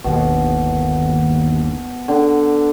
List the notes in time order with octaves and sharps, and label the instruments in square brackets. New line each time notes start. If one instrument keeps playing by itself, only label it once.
[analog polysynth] G1 D#2 [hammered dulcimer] B2
[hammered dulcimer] D3